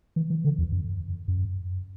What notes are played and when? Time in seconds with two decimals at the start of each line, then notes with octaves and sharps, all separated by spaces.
0.16 E3
0.30 E3
0.44 D3
0.58 E2
0.72 F#2
1.28 F#2